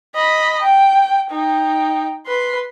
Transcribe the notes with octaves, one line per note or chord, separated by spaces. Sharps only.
D#5 B5
G5
D#4 G5
B4 C6